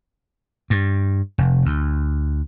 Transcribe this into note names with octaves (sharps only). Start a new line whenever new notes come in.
G2
F1
D2